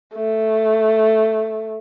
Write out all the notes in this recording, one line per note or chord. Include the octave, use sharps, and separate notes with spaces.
A3